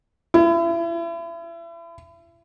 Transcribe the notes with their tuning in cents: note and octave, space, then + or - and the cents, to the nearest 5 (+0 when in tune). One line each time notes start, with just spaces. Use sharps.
E4 +35